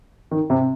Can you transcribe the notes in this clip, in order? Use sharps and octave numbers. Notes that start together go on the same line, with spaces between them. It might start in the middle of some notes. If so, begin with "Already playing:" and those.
D#3
C3